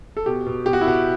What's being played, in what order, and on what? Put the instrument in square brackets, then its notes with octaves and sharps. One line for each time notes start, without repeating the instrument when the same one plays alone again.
[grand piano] A4
B2 G4
B2
B2 G4
F#4
E4
B2 F#4